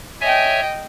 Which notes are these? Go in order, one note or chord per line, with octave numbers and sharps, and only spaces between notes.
C#5 D#5 E5 G5 G#5